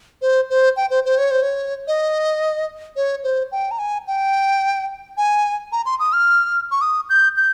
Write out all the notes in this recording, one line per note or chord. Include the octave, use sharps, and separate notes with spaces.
C5
C5
G5
C5
C5
C#5
C5
C#5
D#5
C#5
C5
G5
A#5
G#5
G5
G#5
A#5
C6
D#6
F6
C#6
D#6
G6
G6